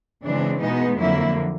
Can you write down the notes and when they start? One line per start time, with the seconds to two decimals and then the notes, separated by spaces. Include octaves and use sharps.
0.23 C#3 E3 G#3 C4 D4
0.61 B2 G#3 B3 D#4
0.98 F2 D3 F#3 A#3 E4